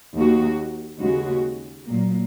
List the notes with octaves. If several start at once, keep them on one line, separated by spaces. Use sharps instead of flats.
D#2 D#3 A#3 F#4
D#2 C#3 G#3 F#4
A#2 F#3 A#3